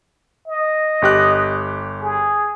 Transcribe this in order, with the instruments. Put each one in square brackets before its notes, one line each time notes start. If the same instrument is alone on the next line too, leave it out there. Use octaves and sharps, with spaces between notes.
[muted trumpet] D#5
[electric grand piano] G1 G4 F#6
[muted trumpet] G#4